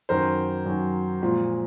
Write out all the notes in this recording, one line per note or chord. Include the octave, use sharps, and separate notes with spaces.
F#2 D#3 F#3 A#4 C5
F#2 D#3 F#3
A#2 F3 G#3